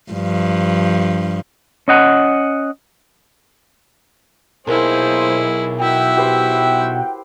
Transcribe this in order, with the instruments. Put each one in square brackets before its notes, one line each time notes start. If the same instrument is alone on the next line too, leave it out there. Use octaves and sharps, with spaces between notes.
[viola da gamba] G2 F3
[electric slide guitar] C#4 D#5 F#5
[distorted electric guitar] B1 [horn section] A#2 A#3 C5 [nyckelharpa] E4 G#4 [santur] A#4
[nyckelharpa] E4 E5 [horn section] F#4 F#5 G5
[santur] G4 B4 C5